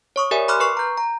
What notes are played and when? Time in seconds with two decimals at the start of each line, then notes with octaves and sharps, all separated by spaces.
0.16 C#5 C#6 D#6
0.31 G4 A#4 D5 E5 G#5
0.48 B5 C6 D6 F6 F#6
0.60 B4 C#6 C7
0.77 A#5 G6
0.98 A#5